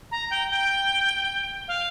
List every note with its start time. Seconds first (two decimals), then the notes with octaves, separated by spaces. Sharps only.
0.11 A#5
0.31 G5
0.50 G5
1.68 F5